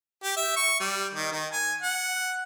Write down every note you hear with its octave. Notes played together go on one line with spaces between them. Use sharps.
G4
E5
C#6
G3
D#3
D#3
G#5
F#5